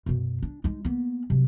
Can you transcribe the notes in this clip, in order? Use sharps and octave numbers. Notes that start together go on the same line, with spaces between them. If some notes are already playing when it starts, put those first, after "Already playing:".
F#2 B2
D4
G#3 D#4
A#3 B3
C3 F#3